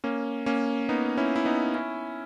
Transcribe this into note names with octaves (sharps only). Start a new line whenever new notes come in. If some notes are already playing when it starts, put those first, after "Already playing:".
A#3 C#4
A#3 C#4
B3 D#4
C#4 E4
E4
B3 D#4
C#4 E4